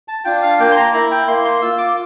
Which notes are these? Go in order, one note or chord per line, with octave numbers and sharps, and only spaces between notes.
A5
D4 F4 G5
F5
A#3 G5
C6
A#5
E4 A#5
G5
A#3 C6
C6
F4 E6
D6